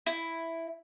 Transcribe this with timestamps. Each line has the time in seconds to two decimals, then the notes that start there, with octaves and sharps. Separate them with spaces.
0.06 E4